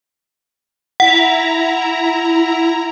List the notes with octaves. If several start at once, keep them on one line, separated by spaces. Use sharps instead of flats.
E4 F#5 A#5